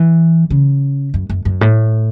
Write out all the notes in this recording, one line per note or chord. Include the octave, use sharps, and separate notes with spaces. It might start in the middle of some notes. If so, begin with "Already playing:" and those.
Already playing: E3
C#3
F#2
F#2
F#2
A2